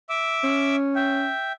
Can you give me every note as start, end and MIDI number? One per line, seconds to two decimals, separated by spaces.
0.09 0.76 76
0.09 0.76 86
0.09 0.76 88
0.44 1.32 61
0.96 1.52 76
0.96 1.52 79